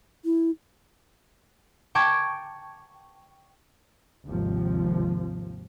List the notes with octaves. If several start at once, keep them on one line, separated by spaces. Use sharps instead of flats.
E4
G5 A5 C#6 D6 G#6
G#1 D#2 C3 F3